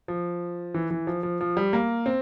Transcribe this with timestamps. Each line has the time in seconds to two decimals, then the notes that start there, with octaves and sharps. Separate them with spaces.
0.08 F3
0.74 E3
0.91 E3
1.07 F3
1.23 F3
1.41 F3
1.57 G3
1.73 A#3
2.06 C4